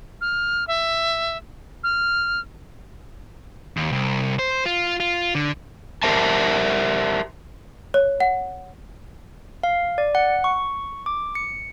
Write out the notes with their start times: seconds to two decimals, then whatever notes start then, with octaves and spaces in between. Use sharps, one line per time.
0.21 F6
0.68 E5
1.84 F6
3.77 D#2
3.92 C2
4.39 C5
4.66 F4
5.00 F4
5.35 D3
6.03 G4 A#4 C5 E5 A5
7.94 C#5
8.20 F#5
9.63 F5
9.98 D5
10.15 F#5
10.44 C#6
11.06 D6
11.35 C#7